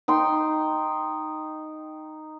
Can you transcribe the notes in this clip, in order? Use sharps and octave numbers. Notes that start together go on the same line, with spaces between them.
D#4 G5 C6